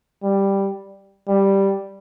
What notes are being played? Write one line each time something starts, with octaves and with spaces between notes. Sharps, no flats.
G3
G3